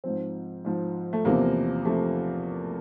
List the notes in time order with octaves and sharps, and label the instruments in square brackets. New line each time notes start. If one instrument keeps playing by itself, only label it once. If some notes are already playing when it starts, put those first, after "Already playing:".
[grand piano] G#2 F3 C4
G#2 F3
A3
E2 C3 F3 A#3
C3 F3 A3